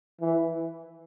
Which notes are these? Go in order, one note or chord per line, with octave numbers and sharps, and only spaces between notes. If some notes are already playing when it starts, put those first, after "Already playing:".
E3